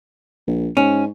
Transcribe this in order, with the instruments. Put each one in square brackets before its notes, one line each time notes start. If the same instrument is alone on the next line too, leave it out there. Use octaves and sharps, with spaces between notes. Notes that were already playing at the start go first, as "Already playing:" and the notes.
[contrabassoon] A#1
[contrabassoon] G#2 [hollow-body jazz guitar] C#4